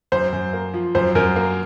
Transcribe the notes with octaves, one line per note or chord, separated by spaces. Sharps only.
F#2 C5
F#2
A#3
F3
F#2 C5
F#2 A#4
A#3